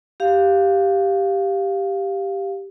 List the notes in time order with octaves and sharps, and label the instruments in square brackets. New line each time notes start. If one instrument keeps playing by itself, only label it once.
[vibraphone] G4 F5